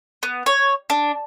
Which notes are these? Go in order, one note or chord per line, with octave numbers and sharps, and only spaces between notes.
B3
C#5
D4